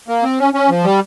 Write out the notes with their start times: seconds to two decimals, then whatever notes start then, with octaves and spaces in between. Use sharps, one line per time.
0.08 A#3
0.23 C4
0.39 C#4
0.54 C#4
0.69 F3
0.84 G3